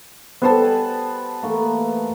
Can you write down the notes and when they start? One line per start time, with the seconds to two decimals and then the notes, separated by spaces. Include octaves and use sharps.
0.42 G3 B3 A4 C5 A5
0.62 B4 F#5 G#5
1.42 E3 A3 A#3